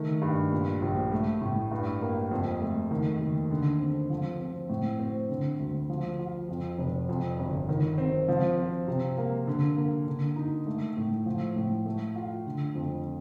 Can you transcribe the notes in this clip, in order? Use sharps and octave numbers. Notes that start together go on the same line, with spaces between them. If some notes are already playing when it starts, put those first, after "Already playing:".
Already playing: D#3 A3
G2
A#2
A#1
A3
A2
G2
A#3
F2
A3
D#3
D#2
D3
C4
F3
C4
A2
C4
D3
D2
F3
F4
F2
F1
F2
G1
D#3
C4
F3
C4
C3
A#3
D3
A#3
D3
D#4
A3
A2
F3
A2
A3
F4
D3
F2